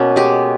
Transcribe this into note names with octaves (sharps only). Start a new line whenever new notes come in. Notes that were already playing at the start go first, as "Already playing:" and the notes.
Already playing: B2 A#3 C#4
G#3 G4